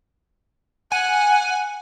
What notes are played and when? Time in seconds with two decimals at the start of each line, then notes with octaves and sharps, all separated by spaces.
0.92 F#5 G#5